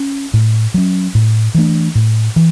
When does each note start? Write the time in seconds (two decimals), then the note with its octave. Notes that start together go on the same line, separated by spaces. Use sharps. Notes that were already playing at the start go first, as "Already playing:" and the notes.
Already playing: C#4
0.34 A2
0.74 F#3 C#4
1.15 A2
1.54 E3 A3 D4
1.95 A2
2.36 E3